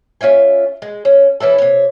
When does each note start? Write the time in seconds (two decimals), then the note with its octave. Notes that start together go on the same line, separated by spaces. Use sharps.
0.21 C#4 F4 E5 G#5
0.82 G#3
1.05 C#4
1.40 E3 C#4 E4 A4
1.58 C3 C#5